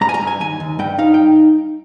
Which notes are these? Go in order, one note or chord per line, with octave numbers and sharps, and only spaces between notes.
G2 A#5
G#5
A#5
G2
G#5
D#2 G#5
D#2
G2 G5
D#4 F5
G5